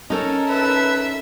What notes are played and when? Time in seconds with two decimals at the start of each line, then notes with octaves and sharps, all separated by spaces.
0.10 C#4 D#4 A4 A#4
0.49 B4 E5